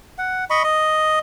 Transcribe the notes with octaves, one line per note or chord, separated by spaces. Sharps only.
F#5
D#5 B5 C#6
D#5